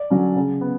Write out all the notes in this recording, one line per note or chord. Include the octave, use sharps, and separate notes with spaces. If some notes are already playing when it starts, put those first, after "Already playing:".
Already playing: D5
D3 F#3 C#4
C#3
B3